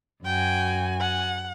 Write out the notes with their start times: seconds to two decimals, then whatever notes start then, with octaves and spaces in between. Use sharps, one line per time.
0.25 F#2 F#4 G5 G#5
1.00 F#5